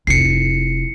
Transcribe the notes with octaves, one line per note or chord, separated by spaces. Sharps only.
F1 E4 C7 C#7